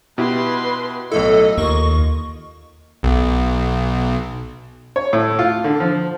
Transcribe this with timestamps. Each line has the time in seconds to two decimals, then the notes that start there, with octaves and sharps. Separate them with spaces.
0.18 B2 E4 G4 B4 C6
1.11 B1 A2 E4 A4 D#5
1.57 D#2 A#3 F4 C#6
3.03 B1
4.96 C#5
5.13 A2
5.39 F4
5.64 D3
5.80 F3